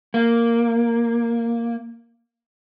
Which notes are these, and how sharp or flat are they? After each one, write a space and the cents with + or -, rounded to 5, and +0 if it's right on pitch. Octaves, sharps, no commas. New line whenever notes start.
A#3 +0